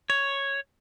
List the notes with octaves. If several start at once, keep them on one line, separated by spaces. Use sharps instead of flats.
C#5